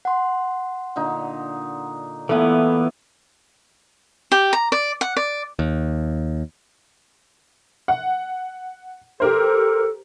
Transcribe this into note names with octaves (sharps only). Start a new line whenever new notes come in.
F#5 C6
A#2 D3 D#4
A#2 E3 A3 B3 E4 A4
G4
A#5
D5
F#5
D5
D#2
F#5
G4 A4 A#4 C5